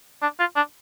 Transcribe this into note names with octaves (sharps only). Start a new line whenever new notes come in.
D4
F4
D4